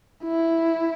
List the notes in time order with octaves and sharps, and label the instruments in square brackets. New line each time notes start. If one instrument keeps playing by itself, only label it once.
[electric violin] E4